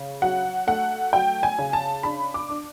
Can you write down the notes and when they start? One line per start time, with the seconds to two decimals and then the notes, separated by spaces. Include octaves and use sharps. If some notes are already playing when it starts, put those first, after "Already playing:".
Already playing: C#3
0.22 F#3 F#5
0.67 A3 F#5
1.13 F#3 G5
1.43 G#5
1.59 C#3
1.73 A5
2.03 D4 B5
2.34 D6
2.49 D4